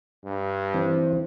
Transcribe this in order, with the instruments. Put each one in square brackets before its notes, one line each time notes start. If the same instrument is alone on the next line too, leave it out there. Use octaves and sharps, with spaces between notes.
[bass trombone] G2
[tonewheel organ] E3 C4